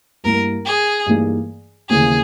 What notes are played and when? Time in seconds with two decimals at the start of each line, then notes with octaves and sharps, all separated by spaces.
0.24 G2 G3 A#3 E4 A#4
0.66 G#4
1.06 G2 E3 A#3 D#4 G#4
1.90 D#2 C#3 E3 A#3 C#4 G#4